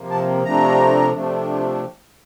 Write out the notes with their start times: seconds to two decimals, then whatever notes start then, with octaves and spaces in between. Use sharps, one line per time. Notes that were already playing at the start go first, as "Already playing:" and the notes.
Already playing: C3 F3 A#3
0.10 A5
0.44 C3 F3 A3 D4 A#5
1.13 C3 F3 A3 D4